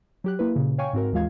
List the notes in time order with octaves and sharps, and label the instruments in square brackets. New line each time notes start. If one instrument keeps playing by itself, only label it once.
[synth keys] F#3 G4 F#6
A#3 E4 B4
A#2 C#3
C#5 F5 G5 G#5 C#6
G#2 C4 F#4 A#4
D#2 E3 G#3 F4 F5 G#6